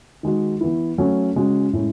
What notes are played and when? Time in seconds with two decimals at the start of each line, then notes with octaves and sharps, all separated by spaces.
0.23 D#3 G#3 D#4 F#4
0.61 E3 B3 E4
0.98 F#3 A3 C#4 F#4
1.35 C#3 G#3 C#4 F#4
1.73 A2 G#3 C#4